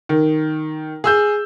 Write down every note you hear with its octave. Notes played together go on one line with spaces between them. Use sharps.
D#3
G#4 E6 G6